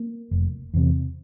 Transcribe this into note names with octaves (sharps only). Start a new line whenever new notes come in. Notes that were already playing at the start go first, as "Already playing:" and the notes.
Already playing: A#3
F1
E2 C3